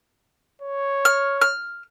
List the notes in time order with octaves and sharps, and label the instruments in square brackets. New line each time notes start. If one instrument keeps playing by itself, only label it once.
[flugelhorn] C#5
[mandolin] F6
F6